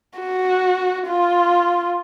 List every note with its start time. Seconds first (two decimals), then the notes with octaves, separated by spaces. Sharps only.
0.19 F#4
1.07 F4